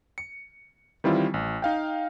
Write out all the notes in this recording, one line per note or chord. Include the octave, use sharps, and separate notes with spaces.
C#7
D#3 E3 G3 C4 E4 F4
A1
D#4 F5 G5